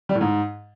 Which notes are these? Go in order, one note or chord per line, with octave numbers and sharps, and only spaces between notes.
G3
A2
G#2